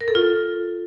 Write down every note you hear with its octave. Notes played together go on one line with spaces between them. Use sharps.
A#4
A4
F4